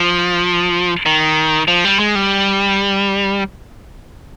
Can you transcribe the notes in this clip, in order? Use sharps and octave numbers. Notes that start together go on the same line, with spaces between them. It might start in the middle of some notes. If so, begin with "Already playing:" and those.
Already playing: F3
D#3
F3
G3
G#3
G3